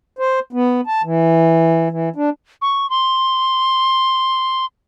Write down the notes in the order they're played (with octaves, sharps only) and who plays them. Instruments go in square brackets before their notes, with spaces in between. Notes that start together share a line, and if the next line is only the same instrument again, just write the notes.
[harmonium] C5
B3
A5
E3
E3
D4
[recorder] C#6
C6